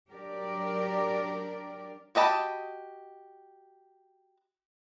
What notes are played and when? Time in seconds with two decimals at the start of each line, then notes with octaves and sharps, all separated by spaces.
0.10 F#3 D4 G4 A#4 D5
2.15 F#4 G4 D#5 A5 B5